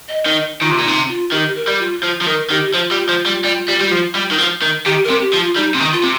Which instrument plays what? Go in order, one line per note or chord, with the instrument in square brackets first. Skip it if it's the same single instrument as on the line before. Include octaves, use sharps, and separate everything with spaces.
[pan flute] D#5
[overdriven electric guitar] D#3 [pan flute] D#5
[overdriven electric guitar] D#3 [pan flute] F4
[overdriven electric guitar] C3
A#2
[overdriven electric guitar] C3 [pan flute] D#4
[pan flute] F4
[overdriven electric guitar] D#3 [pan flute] G4
[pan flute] A#4
[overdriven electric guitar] G3
[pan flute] F4
[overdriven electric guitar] F3 [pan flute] F4
[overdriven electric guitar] F3
[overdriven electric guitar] D#3 [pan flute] A#4
[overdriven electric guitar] D#3 [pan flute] G4
[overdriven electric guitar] F3 [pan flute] F4
[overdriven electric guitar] G3
F3
G3
G3
G3
G3
F3
G3
D#3
F3
D#3
[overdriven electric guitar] D#3 [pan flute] G4
[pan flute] A#4
[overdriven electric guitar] C3
[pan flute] G4
[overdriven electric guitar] F3
[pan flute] F4
[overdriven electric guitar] G3 [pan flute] D#4
[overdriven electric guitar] C3
D#3
[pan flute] F4
[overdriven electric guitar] C3